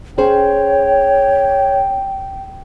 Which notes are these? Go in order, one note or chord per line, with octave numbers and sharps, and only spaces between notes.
C#4 G#4 C5 C#5 G5